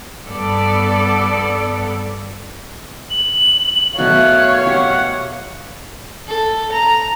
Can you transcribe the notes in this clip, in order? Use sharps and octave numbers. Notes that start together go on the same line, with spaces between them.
G2 B3 A4 D5
F#7
B2 F#3 A3 C#5 F5 F#6
G4 F#5
A4
A#5